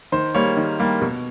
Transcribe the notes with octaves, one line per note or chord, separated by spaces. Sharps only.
D#3 C5
G3 A#3 C#5
D#3
G3 A#3
B2